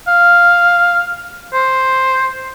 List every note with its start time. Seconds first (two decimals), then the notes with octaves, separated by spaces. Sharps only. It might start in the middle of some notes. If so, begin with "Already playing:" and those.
0.08 F5
1.54 C5